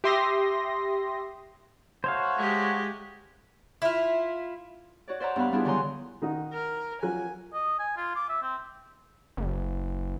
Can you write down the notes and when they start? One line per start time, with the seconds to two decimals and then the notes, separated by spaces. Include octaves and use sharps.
0.04 G4 E5 C6 D#6 A#6
2.04 A3 F#4 C5 C#5 F5
2.37 G#3 G4
3.82 E4 F4
5.08 F#4 C#5 D5
5.20 C5 D5 E5 F#5 A#5
5.36 G2 B3 F5 B5
5.52 G3 B3 D4 E4 F4 G#4
5.65 D3 D#3 F#3 G#5 A#5 C6
6.22 D#3 D#4 F#4
6.53 A#4
7.03 F3 F#3 G#5 F#6
7.54 D#5
7.79 G#5
7.98 F4
8.16 D6
8.29 E5
8.42 C4
9.37 F#1